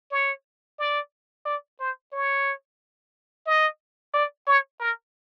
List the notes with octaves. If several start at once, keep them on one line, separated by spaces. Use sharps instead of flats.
C#5
D5
D5
C5
C#5
D#5
D5
C#5
A#4